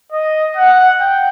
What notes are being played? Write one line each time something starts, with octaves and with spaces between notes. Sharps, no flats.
D#5
F#5
G5